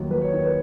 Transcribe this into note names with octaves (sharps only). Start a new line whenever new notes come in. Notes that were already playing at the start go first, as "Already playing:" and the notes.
Already playing: D#2 F#3
F#3 B4
C#5
D#3 C#5
B4